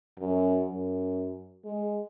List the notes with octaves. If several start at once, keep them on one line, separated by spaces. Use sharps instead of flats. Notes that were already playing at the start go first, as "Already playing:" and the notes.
F#2
F#2
G#3